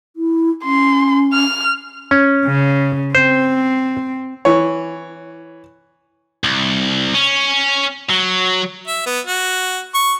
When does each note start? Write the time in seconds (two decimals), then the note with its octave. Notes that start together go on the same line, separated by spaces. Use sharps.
0.16 E4
0.64 C#4 C6
1.33 F6
2.11 C#4
2.46 C#3
3.15 C4 C5
4.45 E3 C#5
6.44 C2
7.15 C#4
8.10 F#3
8.88 E5
9.06 B3
9.27 F#4
9.94 C#6